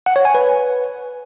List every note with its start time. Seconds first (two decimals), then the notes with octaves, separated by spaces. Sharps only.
0.06 F#5
0.16 C#5
0.25 G#5
0.34 B4